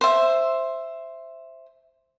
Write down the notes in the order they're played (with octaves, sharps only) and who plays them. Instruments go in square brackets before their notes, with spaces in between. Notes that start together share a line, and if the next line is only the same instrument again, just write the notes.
[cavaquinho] C5 E5